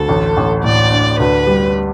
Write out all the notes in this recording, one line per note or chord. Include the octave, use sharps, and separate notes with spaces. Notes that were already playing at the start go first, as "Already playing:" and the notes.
Already playing: D2 A4
A1
A1
A2 D5
D4
D2 B4
G3